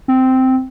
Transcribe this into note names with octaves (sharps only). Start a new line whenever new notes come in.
C4